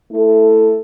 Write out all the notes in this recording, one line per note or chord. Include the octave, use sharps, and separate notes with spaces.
A3 E4 A4